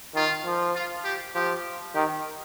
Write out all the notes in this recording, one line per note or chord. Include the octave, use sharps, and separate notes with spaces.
D#3 F4
F3
F4
G4
F3 G4
D#3 G4